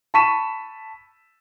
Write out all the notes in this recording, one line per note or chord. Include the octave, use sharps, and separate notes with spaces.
A5 B5 C#6 B6 D#7 E7